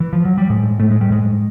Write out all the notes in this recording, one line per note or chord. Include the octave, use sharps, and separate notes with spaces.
E3
F3
F#3
G3
A2 G#3
A2 A3
G#3
G3
A2 G#3